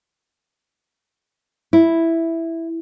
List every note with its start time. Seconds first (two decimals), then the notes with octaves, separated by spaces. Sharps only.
1.73 E4